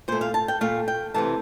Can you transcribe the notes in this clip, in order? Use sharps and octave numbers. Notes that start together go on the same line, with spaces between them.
A#2 A3 C5
F5
A5
G5
A#2 A3 F5
G5
C3 E3 A3 A5